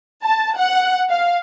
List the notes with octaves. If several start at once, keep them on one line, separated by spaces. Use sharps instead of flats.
A5
F#5
F5